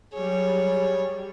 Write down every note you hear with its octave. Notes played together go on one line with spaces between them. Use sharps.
F#3 G3 G#4 C#5